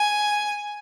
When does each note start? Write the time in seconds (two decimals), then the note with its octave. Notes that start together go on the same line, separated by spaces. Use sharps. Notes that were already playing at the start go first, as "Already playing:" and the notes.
Already playing: G#5